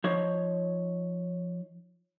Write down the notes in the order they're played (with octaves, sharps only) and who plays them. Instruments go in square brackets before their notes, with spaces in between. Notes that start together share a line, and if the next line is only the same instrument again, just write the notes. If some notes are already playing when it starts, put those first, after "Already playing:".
[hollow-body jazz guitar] F3 D#4 C#5